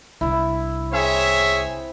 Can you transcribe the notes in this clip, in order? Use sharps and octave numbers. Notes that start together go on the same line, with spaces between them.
C2 D4 E4
C4 G#4 C#5 E5